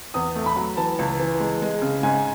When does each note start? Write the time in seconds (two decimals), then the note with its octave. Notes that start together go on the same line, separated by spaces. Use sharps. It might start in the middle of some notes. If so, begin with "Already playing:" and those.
0.14 E2 D#6
0.36 A3
0.46 B5
0.56 F#3
0.77 E3 A5
0.99 C#2
1.19 E3
1.40 G#3
1.62 G#3
1.82 C#3
2.03 G#2 G#5